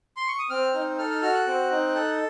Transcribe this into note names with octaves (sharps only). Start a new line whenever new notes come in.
C6
C#6
D#6
C4 F6
D#4
A4 F6
F6
F#4 F6
F#6
C4
D#4
A4